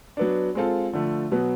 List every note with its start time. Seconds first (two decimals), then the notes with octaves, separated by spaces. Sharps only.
0.17 F#3 B3 D4
0.55 G#3 C4 F4 A4
0.93 D3 F3 A3
1.31 B2 F#3 B3